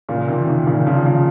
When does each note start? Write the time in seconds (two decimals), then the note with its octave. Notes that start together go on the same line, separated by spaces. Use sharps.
0.09 A#2 C#3
0.27 C3 D#3
0.47 C3 D#3
0.66 A#2 C#3
0.86 C#3 F3
1.06 C#3 F3